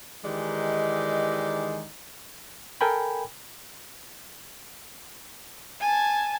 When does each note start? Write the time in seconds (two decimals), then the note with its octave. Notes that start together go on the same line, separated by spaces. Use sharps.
0.24 D#3 E3 G#3 D#4 G4 D5
2.81 A4 A#4 G5 G#5 B5
5.80 G#5 A5